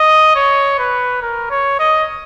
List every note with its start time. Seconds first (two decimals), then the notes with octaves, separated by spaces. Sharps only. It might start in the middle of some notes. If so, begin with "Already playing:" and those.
Already playing: D#5
0.36 C#5
0.79 B4
1.22 A#4
1.51 C#5
1.79 D#5